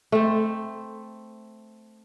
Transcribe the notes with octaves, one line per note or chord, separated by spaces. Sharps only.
A3 C4